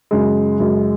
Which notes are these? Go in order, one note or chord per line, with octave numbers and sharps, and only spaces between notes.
F#2 C#3 G#3
F#2 C#3 G#3